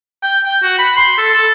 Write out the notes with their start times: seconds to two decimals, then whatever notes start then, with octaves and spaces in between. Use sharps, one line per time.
0.23 G5
0.46 G5
0.63 F#4
0.79 B5
0.97 C6
1.18 A4
1.34 A4